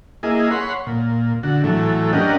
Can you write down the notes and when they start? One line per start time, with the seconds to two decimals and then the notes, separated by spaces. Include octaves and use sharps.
0.23 A#3 E4 G#4 D#5
0.51 C#5 F#5 B5 C6
0.87 A#2
1.43 D3 F#4
1.64 A2 E3 F#3 A3
2.13 C#4 D4 G4 A#4 D#5 F#5